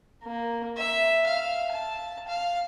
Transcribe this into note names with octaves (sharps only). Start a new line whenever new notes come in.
A#3
E5
F5
A5
F5